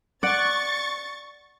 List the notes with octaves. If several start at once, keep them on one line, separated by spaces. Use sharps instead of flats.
D5 F#5 C#6 A6